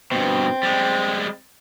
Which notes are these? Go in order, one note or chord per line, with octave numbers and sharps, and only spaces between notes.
G2 B2 C4
G3 G#3